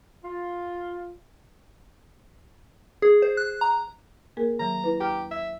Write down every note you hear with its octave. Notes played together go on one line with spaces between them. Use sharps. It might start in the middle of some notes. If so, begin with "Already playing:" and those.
F4
G#4
C5
F#6
A#5
A#3 G#4 A#4
D#3 F#3 A#5
E4 B4
D#2 G4 A#5 F6
E5